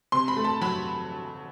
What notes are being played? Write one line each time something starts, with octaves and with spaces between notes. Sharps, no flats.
C3 C6
B5
A3
A5
F#3 B5